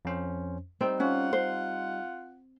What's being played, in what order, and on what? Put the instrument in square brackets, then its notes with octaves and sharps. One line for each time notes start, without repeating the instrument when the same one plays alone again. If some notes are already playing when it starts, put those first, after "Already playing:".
[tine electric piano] F2 C#4 C5
[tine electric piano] G3 D#4 [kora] C4
[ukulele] C#4 [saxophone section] F4 F#5
[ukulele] C5